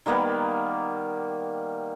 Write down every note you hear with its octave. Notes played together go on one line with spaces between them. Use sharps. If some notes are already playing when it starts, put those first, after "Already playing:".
D#3 G3 A#3 B3